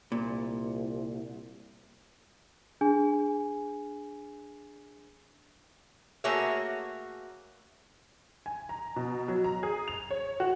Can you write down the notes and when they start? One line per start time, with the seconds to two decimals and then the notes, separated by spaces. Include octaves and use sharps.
0.12 C2 A#2
2.81 D4 G#4 G#5
6.24 A3 A#3 F#4 G#4 C#5 E5
8.46 G#5
8.69 A#5
8.96 B2
9.28 F#3
9.44 A#5
9.63 G#4
9.88 F7
10.11 C#5
10.40 F#4